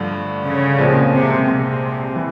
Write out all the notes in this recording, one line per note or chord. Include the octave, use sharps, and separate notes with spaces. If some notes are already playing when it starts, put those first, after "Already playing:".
Already playing: G2 D3 F3 A3
C#3
C2 A#2 F3 G#3 C4
C3
C3
E3